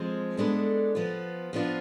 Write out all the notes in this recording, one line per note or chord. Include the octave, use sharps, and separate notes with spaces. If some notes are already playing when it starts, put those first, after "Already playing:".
Already playing: F3 G#3 C4 G#4
G#3 B3 D4 A4
F3 B3 F4
F3 B3 D4 F4